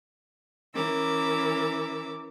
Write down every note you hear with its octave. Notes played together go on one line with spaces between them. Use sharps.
E3 C#4 A#4 D6 E6